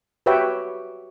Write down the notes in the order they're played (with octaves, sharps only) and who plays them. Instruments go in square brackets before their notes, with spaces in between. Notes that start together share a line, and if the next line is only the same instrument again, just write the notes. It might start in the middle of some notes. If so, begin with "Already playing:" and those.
[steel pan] F#4 G4 B4 C#5 E5 G5